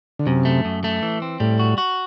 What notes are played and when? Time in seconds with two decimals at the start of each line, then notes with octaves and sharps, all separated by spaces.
0.19 D3
0.26 F#2 C3
0.45 A3
0.65 F#2
0.84 A3
1.02 E3
1.22 C4
1.40 A2 G3
1.59 F#4
1.78 F#4